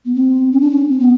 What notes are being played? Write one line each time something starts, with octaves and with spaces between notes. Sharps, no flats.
B3
C4
C#4
D4
C#4
C4
B3